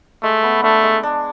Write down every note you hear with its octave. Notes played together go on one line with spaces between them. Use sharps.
G#3 A3
B3
A3 D4
G#3
D4